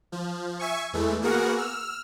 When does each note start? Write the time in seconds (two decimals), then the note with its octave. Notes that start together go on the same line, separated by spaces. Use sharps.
0.12 F3
0.59 E5 G#5 C#6
0.93 E2 E3 G#3 A3
1.22 A#3 B3 F#4 G#4 A#4 F#5
1.57 E6 F6